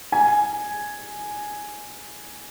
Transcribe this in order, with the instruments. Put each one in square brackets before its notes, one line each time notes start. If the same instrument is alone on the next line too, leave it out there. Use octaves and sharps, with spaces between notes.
[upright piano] G#5